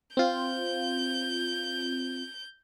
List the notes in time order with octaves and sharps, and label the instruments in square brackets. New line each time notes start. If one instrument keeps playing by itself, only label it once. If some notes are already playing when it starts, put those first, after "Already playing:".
[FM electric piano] C4 F4 [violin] G6